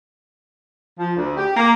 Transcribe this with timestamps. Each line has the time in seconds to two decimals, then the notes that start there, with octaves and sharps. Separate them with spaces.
0.99 F3
1.17 D2
1.37 G4
1.56 A#3